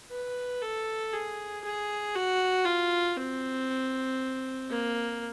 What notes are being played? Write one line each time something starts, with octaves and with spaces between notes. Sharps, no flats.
B4
A4
G#4
G#4
F#4
F4
C4
A#3